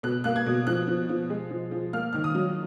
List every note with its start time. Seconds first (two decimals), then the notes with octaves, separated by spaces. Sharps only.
0.03 B2 F#6
0.24 A#3 F#6
0.36 G#6
0.46 B2
0.67 F3 F#6
0.87 F3
1.09 F3
1.30 G#3
1.50 F3
1.71 F3
1.93 A#3 F6
2.13 D#3 F6
2.24 D#6
2.35 F#3